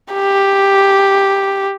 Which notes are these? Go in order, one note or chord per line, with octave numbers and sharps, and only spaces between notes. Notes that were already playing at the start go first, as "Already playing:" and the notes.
G4